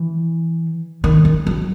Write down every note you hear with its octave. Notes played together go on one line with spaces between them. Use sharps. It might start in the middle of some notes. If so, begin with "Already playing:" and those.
Already playing: E3
D#3
E3
F#3